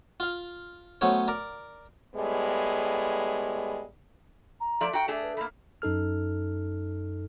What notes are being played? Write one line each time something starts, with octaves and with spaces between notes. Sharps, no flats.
F4 F5
F#3 A3 B3 C#4 C5 C#5
A#4 D5 A#5
A2 G3 G#3 B3
A#5
F3 A3 D5
F#4 G5 A#5
A3 D4 G#4 E5
B4
A3 A#3 B5
F#2 D#4 A4 F6